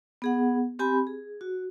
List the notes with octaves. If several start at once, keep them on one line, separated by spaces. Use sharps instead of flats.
B3 G#4 F#5
C4 G4 G#5 B5
G#4
F#4